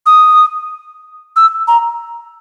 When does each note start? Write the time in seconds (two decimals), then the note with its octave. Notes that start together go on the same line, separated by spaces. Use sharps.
0.06 D#6
1.36 E6
1.68 A#5